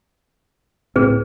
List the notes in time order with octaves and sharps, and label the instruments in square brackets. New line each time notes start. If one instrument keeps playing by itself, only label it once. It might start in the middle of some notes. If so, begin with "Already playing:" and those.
[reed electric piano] C#2 A2 [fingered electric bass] C4 [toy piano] G#4 B4